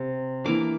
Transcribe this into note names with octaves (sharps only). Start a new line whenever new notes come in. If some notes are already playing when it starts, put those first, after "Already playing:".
Already playing: C3
E3 A#3 D4 D6